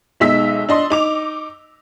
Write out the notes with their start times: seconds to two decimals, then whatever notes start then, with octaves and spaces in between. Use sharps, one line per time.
0.20 B1 G#3 D#4 E5 E6 B6
0.69 D4 D#5 C6
0.90 D#4 D6 F7